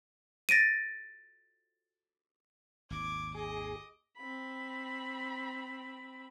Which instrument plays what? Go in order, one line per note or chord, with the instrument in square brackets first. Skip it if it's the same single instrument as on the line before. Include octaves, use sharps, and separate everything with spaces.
[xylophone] A6 A#6 D7 D#7
[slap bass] G#1 D#2 [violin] D6 G#6
[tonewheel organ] G#4 [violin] D#5 D6
[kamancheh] C4 B5